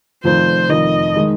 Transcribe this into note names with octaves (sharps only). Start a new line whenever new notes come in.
F1 F2 D#3 C5
F1 F2 D#3 D#5
D#3 G#3 D#4